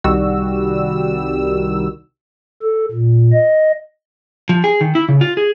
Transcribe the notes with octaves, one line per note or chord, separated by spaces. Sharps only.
C2 D#3 G3 F#4 E6
A4
A#2
D#5
F3
G#4
D#3
E4
C#3
F4
G#4